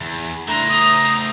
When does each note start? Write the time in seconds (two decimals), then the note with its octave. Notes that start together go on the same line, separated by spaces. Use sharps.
0.01 E2
0.48 G3 A3 D4 E4 C5 A#5
0.70 D#6